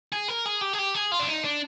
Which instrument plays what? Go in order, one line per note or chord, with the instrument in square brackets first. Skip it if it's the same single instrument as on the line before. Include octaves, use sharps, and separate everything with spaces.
[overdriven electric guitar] G#4
A#4
G#4
G4
G#4
G4
G#4
F4
D4
D#4
D4